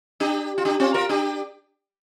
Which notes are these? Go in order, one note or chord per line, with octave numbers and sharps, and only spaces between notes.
D4 G4
F4
D4 G4
C4 F4
F4 A#4
D4 G4